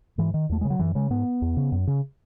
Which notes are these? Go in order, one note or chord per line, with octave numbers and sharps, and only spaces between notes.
G#2 E3
D#3
E2 A3
C#3 G#3
F#3
F#2 E3
C#3 G#3
G#2 B3
E2
C#3
F#2
C#3